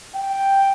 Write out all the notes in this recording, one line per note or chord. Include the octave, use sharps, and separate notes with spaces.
G5